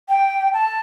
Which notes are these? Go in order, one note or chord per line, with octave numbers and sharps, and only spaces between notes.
G5
A5